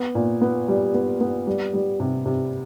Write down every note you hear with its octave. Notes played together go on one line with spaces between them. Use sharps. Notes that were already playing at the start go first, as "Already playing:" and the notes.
Already playing: B3
A#2
B3
G3
B3
B3
G3
G3
C3
C3